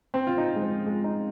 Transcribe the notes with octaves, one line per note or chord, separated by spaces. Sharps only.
C4
F4
D#4
G#3
F3
G#3
D#4